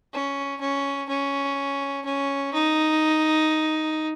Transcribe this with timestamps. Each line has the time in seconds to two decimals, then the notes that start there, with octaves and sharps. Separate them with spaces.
0.13 C#4
0.61 C#4
1.09 C#4
2.05 C#4
2.54 D#4